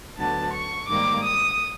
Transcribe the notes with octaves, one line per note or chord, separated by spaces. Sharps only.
D2 D3 F#3 B3 A5
C#6
G#2 D#3 G3 A#3 D6
D#6